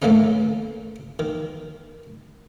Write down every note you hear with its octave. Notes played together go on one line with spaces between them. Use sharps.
A2 E3 A3 A#3 C#4 D#4
D#3